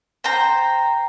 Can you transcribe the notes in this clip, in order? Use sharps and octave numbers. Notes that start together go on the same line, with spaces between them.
C5 G5 A#5